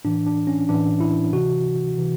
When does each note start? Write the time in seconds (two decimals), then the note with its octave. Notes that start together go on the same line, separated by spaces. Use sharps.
0.05 A2 E3 D4
0.26 D4
0.47 C#4
0.69 A2 E3 D4
1.00 E4
1.33 C3 E3 F#4
1.97 C3 E3